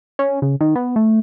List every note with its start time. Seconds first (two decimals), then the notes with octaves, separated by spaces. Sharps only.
0.19 C#4
0.42 C#3
0.61 D#3
0.75 B3
0.96 A3